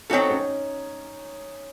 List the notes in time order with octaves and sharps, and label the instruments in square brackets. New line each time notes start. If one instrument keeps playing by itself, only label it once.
[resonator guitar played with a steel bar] F#3 C4 F#4 A4 [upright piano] D#4
[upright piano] C#4